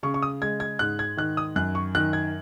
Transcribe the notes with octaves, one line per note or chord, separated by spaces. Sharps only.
C#3 C#6
C#6
D#6
G#3 G#6
G#6
G#2 F#6
G#6
D#3 F#6
D#6
F#2 F#6
C#6
D#3 F#6
G#6